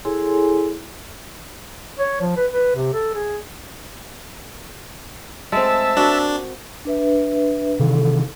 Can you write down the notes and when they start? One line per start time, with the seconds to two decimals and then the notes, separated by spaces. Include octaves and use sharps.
0.05 E4 G#4 A4 C#5 G#5 C6
1.99 C#5
2.21 F3
2.37 B4
2.52 B4
2.75 C3
2.94 A4
3.15 G#4
5.52 G#3 A3 C4 E5 A5
5.97 D4 F#4 A#4
6.85 D4 B4 E5
7.80 C3 D#3 E3 A4